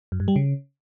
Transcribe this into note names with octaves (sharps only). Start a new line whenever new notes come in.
F#2
G2
G3
C#3